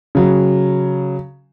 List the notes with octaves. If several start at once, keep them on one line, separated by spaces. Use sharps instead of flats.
C#3 F#3